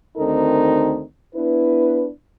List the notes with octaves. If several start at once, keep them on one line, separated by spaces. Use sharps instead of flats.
D2 D#3 C4 D#4 A4 A#4
B3 D4 E4 B4